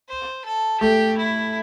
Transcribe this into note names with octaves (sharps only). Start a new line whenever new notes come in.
C5
A4
A3 G4
E4